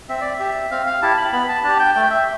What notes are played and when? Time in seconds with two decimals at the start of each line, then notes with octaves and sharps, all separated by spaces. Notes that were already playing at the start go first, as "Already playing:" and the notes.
0.09 C4 E5
0.21 D5
0.33 E5
0.40 G4
0.71 C4 F5
0.87 F5
1.02 E4 G4 A5
1.17 B5
1.32 B3 B5
1.49 A5
1.63 D4 G4 A5
1.79 G5
1.95 A3 G5
2.10 E5